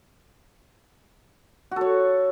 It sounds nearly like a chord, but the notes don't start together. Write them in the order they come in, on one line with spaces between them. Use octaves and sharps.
F#4 A4 C#5